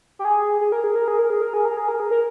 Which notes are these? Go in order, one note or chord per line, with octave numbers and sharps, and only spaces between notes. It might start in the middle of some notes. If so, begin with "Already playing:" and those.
G4
G#4
G#4
A#4
G#4
A#4
G#4
A#4
G#4
A#4
G#4
A#4
G#4
A#4
G#4
A#4